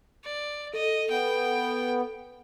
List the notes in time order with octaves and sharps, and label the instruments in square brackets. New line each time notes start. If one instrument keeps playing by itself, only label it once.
[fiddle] D5
[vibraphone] A4 [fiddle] D#5
[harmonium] B3 [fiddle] G5